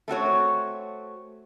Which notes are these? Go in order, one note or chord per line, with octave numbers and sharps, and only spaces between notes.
A3 C4 F#4 C#5